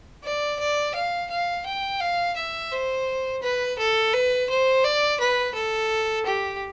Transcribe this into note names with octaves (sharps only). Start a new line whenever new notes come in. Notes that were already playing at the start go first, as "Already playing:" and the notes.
D5
D5
F5
F5
G5
F5
E5
C5
B4
A4
B4
C5
D5
B4
A4
G4